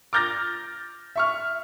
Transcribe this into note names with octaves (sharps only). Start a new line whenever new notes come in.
D6 F6 G6 A6 A#6
E5 C#6 F6